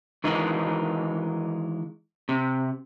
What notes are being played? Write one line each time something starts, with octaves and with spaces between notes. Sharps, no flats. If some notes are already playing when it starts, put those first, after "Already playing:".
D#3 E3 G#3 D#4
C3